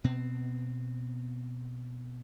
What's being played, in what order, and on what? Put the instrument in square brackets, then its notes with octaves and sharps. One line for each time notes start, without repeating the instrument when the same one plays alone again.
[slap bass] B2 B3 C4